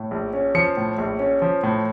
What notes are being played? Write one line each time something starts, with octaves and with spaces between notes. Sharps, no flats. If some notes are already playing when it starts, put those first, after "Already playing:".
Already playing: A2
A#1
C#4
F3 C#7
A2
A#1
C#4
F3
A2